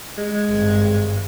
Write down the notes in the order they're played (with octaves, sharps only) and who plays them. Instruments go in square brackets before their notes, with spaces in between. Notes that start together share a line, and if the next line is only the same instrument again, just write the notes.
[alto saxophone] G#3
[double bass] G#1 G2